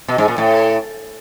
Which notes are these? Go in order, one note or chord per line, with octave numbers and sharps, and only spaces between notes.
B2
G#2
A#2
A2